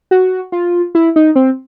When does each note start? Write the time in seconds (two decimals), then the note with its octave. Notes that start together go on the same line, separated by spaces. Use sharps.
0.11 F#4
0.52 F4
0.95 E4
1.16 D#4
1.36 C4